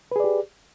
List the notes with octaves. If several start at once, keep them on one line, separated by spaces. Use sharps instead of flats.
G4 G#4 B4 D5